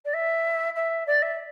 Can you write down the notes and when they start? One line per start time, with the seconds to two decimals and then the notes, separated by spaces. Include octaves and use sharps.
0.05 D5
0.13 E5
0.75 E5
1.07 D5
1.22 E5